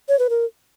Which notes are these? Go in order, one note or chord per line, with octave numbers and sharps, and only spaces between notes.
C#5
B4
A#4